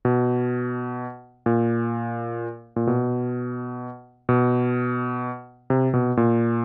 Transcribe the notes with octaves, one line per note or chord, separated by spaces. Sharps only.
B2
A#2
A#2
B2
B2
C3
B2
A#2